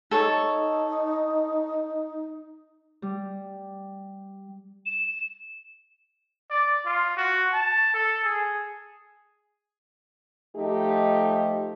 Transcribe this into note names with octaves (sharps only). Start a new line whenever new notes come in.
D#4 A4 C#5
G3
E7
D5
F4
F#4
A5
A4
G#4
F3 A3 D#4 G4